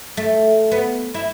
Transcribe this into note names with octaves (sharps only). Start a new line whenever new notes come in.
A3
B3
E4